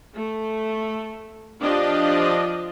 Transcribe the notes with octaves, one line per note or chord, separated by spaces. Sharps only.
A3
F3 D4 F4 G4 D5 D#5